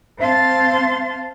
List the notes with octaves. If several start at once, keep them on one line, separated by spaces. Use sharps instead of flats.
C4 C5 F5 A5 C6 A6